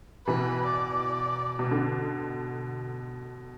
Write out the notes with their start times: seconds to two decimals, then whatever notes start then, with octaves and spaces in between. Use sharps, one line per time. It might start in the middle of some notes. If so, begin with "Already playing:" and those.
0.27 B2 E3 B4
0.66 D5
1.59 B2
1.71 D3